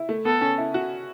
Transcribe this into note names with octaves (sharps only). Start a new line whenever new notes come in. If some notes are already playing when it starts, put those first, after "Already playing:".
Already playing: E4
A3
B3 A4
C#4
E4
F#4